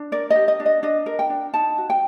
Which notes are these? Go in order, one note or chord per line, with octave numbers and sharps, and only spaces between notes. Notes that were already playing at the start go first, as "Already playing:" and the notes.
Already playing: D4
A#4 D5
D#5
G4
D#5
D4
D#5
D4 D#5
A#4
G5
D4
D#4 A5
F#4
G5